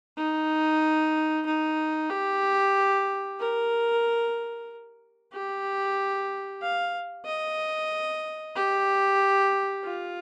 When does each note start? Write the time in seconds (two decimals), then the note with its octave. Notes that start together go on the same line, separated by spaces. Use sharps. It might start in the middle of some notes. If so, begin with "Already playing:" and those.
0.17 D#4
1.46 D#4
2.11 G4
3.39 A#4
5.33 G4
6.62 F5
7.26 D#5
8.55 G4
9.85 F4